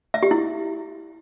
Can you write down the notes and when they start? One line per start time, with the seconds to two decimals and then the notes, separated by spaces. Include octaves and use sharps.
0.14 E5
0.23 G4
0.31 E4